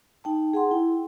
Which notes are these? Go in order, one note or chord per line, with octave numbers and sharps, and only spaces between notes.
D#4 G5 A5
G#4 F#5 C6
E4 G5